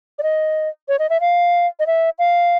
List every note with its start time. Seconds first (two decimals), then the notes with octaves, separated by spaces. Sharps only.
0.19 D5
0.23 D#5
0.89 C#5
0.99 D#5
1.10 E5
1.21 F5
1.80 D#5
1.87 E5
2.19 F5